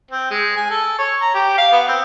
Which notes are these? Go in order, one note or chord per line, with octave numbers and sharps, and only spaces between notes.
C4
G#3
G#5
A4
C#5
A#5
G4
F5
B3
C4